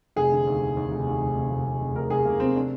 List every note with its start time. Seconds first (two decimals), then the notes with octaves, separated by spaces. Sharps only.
0.16 F1 G#4
0.32 D3
0.47 D#2
0.62 D#2
0.77 D#2
0.92 F1
1.06 D#2
1.21 F1
1.36 F1
1.50 F1
1.66 F1
1.81 F1
1.95 F1 A#4
2.10 F1 G#4
2.25 F1 A#3
2.40 F1 C4
2.56 D4